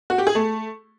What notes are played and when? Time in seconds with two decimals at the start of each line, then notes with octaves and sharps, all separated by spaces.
0.10 F#4
0.18 G4
0.27 G#4
0.35 A3